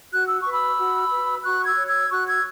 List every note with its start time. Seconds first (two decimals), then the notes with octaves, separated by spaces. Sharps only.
0.12 F#4 F#6
0.25 E6
0.38 C#6
0.45 B4
0.52 B5 E6
0.78 F#4
1.11 B4
1.44 F#4 C#6 F#6
1.66 E6 G#6
1.77 C#5
1.88 E6 G#6
2.10 F#4 C#6 F#6
2.27 E6 G#6